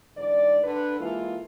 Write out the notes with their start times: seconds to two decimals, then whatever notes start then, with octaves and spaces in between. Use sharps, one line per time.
0.17 E2 G#2 D3 D5
0.64 D3 B4
1.01 E3 G#3 A#3 E4 F4 A4